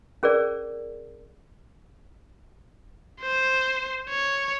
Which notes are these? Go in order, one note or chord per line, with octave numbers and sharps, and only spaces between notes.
C#4 G#4 A#4 D5
C5
C#5